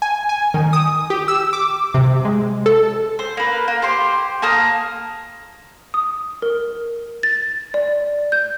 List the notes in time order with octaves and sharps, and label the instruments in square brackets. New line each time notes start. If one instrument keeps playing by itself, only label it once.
[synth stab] G#5
G#5
D#3
D#6
G4
E6
D6
C3
G#3
A4
[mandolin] C5
A#3 B4
A#3
G4 C5 C6
A#3 A5 D#6 F6
[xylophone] D#6
A#4
A6
D5
G6